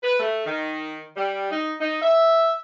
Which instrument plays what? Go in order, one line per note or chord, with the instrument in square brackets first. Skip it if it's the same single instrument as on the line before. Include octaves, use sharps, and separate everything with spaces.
[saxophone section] B4
A3
D#3
G3
D#4
D#4
E5